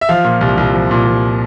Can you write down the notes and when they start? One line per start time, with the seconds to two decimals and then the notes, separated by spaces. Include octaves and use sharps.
0.01 E5
0.09 F3 F5
0.25 A#2
0.41 C2
0.57 C2
0.74 F3
0.91 A#2
1.07 C2